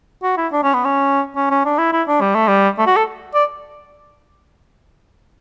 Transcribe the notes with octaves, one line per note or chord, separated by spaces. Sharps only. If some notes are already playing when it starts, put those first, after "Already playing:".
F#4
E4
D4
C#4
B3
C#4
C#4
C#4
D4
E4
E4
D4
G3
A3
G3
A3
F#4
A4
D5